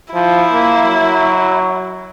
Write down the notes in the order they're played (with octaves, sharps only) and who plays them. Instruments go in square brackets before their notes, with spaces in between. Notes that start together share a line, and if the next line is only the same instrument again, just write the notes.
[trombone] F3 [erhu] E4
[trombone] A#3
F#3